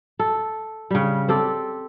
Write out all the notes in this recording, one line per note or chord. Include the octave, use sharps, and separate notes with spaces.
A4
C#3 G3
C4 G4 A4